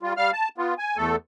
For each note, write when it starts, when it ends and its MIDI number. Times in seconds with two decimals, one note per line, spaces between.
0.03 0.13 55
0.03 0.13 65
0.17 0.31 55
0.17 0.31 77
0.17 0.31 89
0.33 0.49 81
0.58 0.74 59
0.58 0.74 65
0.78 0.97 80
0.97 1.16 40
0.97 1.16 57
0.97 1.16 69